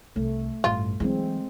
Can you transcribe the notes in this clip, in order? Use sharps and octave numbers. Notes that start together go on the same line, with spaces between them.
C2 A3
A1 G2 F4
E3 F#3 G#3 C4